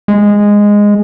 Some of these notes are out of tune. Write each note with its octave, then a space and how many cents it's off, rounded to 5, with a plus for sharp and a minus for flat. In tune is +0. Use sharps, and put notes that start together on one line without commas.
G#3 -10